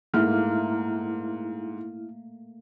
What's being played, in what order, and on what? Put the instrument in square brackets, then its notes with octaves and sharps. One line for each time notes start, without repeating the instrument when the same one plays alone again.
[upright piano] G#2 [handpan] A3 A#3 [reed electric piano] E4 F6